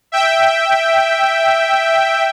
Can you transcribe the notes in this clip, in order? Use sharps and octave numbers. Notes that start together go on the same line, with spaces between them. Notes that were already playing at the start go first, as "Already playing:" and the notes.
E5 G5